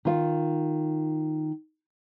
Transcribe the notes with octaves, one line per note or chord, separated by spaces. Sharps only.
D#3 F4